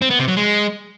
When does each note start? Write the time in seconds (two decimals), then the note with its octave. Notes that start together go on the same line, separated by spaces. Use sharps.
0.02 C4
0.10 B3
0.19 C3
0.28 F#3
0.36 G#3